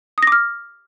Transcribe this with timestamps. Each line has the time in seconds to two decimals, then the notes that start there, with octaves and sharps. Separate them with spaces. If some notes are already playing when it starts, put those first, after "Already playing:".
0.18 D#6
0.23 A#6
0.27 D6
0.32 F6